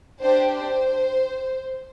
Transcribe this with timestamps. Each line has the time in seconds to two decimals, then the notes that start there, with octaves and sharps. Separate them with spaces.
0.21 D4 G4 C5
0.53 C5